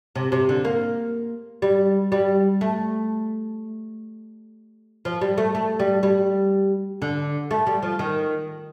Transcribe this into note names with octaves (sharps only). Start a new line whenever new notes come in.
C3
C3
D3
A#3
G3
G3
A3
F3
G3
A3
A3
G3
G3
D3
A3
G3
F3
D#3